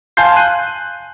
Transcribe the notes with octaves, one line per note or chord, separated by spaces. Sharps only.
F5 G#5 A5 C6 G6 C7
F#6 D#7